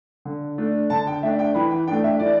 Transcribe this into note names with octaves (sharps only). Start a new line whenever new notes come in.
D3
A3 D4
D3 A5
G5
A3 D4 E5
G5
E3 B5
G5
A3 D4 G5
E5
E3 D5